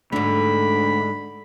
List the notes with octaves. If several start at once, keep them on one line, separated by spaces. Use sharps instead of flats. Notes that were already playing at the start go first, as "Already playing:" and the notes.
G#2 D3 A3 D4 B5